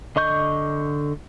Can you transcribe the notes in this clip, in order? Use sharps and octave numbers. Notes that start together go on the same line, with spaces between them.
D3 D#5 C#6 G6